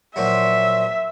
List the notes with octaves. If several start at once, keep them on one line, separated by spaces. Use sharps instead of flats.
A#2 F3 F#3 E5